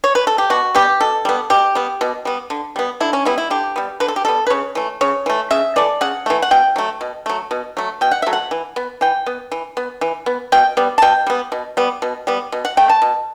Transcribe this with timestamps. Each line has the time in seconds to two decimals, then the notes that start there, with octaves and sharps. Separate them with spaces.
0.04 C#5
0.15 B4
0.27 A4
0.38 G4
0.50 B2 F#4
0.75 G3 B3 G4
1.01 B2 A4
1.25 G3 B3
1.50 B2 G4
1.75 G3 B3
2.01 B2
2.25 G3 B3
2.50 D3
2.76 G3 B3
3.00 D3 E4
3.13 C#4
3.25 G3 B3 E4
3.38 E4
3.50 D3 G4
3.76 G3 B3
4.00 D3 B4
4.08 A4
4.16 G4
4.25 G3 B3 A4
4.47 B4
4.50 C#3 C#5
4.75 E3 A3
5.01 C#3 C#5
5.26 E3 A3
5.51 C#3 E5
5.76 E3 A3 D5
6.01 C#3 F#5
6.26 E3 A3
6.42 F#5
6.51 B2 G5
6.76 F#3 A3
7.01 B2
7.26 F#3 A3
7.51 B2
7.77 F#3 A3
8.01 B2 G5
8.11 F#5
8.22 F#3 A3 E5
8.33 F#5
8.51 E3
8.76 B3
9.01 E3 G5
9.26 B3
9.52 E3
9.77 B3
10.01 E3
10.26 B3
10.52 B2 G5
10.77 G3 B3
10.98 A5
11.02 B2 G5
11.27 G3 B3
11.52 B2
11.77 G3 B3
12.02 B2
12.27 G3 B3
12.52 B2
12.65 F#5
12.77 A3 G5
12.90 A5
13.02 B2